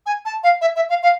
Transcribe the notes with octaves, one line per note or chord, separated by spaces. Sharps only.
G#5
A5
F5
E5
E5
F5
F5